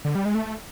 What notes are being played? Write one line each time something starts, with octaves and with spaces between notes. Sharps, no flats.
D3
G3
G#3
A3